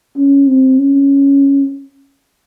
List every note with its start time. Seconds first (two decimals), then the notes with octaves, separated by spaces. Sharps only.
0.17 C#4
0.48 C4
0.78 C#4